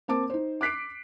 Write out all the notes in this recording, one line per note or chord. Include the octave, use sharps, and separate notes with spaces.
A#3 C4 A5 D6
D#4 C5
D6 F#6 B6 C7 D7